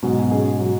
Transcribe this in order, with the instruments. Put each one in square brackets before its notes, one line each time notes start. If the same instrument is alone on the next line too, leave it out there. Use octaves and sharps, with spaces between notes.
[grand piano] G#2 B2 [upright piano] F#3
[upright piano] C#4 G#4
F#3